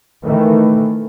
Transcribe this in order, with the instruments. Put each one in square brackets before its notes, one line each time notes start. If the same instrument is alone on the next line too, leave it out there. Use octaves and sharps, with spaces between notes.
[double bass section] D#3 E3 A3